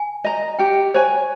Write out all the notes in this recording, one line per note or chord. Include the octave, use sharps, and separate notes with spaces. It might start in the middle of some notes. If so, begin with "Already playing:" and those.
Already playing: G#5
D#5 A#5
G4 G5
C5 C#5 G#5